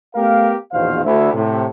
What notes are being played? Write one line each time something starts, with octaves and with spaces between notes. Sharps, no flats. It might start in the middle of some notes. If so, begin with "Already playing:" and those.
A3 B3 G4 A#4 F5
A#1 E2 B2 D#3 C5 F5
D2 E4
A2 C3